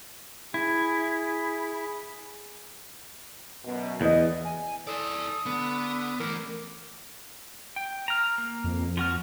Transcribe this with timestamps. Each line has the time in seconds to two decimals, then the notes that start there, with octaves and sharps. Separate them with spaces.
0.54 E4 G#4
3.65 F#2 B2
4.01 E2 D#5
4.44 G#5
4.87 E4 A4 D5 D#6
5.46 D3 B3
6.20 E3 A3 A#4 D6
7.76 G5
8.08 A#5 F6
8.38 A#3
8.64 F2
8.97 F3 F#4 F6